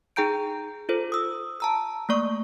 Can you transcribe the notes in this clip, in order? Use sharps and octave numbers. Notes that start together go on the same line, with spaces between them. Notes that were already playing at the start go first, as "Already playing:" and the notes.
D#4 G#4 G5 A#5 G6 D7
F4 A4 C5
D#6 E6
A5 A#5 E6
A3 A#3 D5 C#6